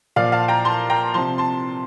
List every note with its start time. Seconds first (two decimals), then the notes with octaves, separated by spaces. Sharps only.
0.16 A#2 F3 D5 F5
0.32 F5 A5
0.48 G5 A#5
0.65 A5 C6
0.90 G5 A#5
1.14 C3 F3 A5 C6
1.38 A5 C6